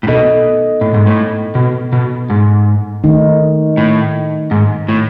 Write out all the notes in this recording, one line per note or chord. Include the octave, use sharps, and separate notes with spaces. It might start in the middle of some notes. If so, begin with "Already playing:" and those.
A2
B2 B3 D#4 A4 D#5
A2
G#2
A2
B2
B2
G#2
D#3 A3 D#4
A2
G#2
A2